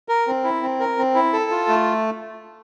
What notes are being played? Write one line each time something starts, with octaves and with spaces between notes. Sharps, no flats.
A#4
C4
E4
C4
A#4
C4
E4
A4
F4
A3